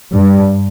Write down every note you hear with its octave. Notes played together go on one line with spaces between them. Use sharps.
G2